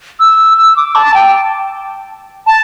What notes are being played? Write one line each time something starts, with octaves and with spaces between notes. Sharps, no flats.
E6
E6
D6
A5
G5
A5